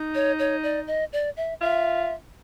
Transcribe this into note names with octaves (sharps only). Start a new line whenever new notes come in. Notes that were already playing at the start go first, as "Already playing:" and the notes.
Already playing: D#4
C#5
C#5
D5
D#5
D5
E5
F4 E5